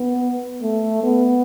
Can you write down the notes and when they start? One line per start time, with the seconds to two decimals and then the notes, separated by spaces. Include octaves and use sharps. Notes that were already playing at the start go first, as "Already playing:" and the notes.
Already playing: B3
0.62 A3
1.03 B3